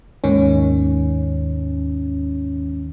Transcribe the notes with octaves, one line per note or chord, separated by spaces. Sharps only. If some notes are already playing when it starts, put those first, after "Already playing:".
D#2 G#2 D#3 C#4